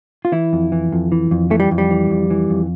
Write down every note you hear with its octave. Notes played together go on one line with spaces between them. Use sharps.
F4
E3 E4
F2
E3
F2
E3
F2
E3 A3
G3
F2
G3
E3
F2
E3
F2